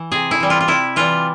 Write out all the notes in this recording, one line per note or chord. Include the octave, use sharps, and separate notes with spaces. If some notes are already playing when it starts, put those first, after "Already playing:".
Already playing: E3
C3 G#4
E4
E3 G3
F4
F4
C3 E4
E3 G3 F4